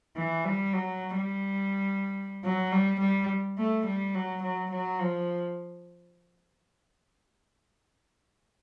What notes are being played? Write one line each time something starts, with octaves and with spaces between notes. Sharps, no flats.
E3
G3
F#3
G3
F#3
G3
G3
A3
G3
F#3
F#3
F#3
F3